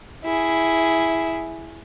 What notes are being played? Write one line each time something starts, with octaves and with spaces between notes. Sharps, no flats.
E4 G#4